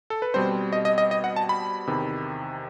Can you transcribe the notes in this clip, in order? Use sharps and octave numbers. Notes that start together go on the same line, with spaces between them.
A4
B4
B2 G3 C4 C5
D#5
D#5
D#5
D#5
F#5
A5
B5
E2 C3 D#3